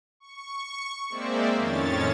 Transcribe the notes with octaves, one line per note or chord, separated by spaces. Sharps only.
C#6
G#3 A#3 C4 C5 D5 E5
F2 A2 D#3 C#4 C#5 A6